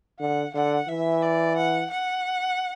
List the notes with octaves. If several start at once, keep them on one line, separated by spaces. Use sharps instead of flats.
D3 F#5
D3 F#5
E3 E5
D5
F#5
F#5